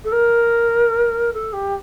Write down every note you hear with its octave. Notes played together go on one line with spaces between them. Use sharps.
A4
A#4
A4
G4